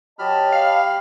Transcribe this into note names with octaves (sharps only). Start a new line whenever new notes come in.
F#3 G4 D#5 A5 B5 F6
F5